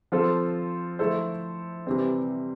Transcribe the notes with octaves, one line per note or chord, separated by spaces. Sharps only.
F3 C4 F4 A4 C5
F3 A3 E4 A4 C5
C3 E3 G3 C4